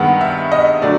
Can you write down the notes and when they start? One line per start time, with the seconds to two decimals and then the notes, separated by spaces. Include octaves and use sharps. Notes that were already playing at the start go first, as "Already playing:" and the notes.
Already playing: G2 D#3 G#3 B3 F#5
0.21 E5
0.52 D#5
0.82 D3 F#3 A3 D5